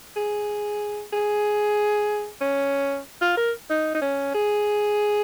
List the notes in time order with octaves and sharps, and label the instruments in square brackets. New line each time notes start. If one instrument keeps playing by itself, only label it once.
[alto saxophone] G#4
G#4
C#4
F4
A#4
D#4
D#4
C#4
G#4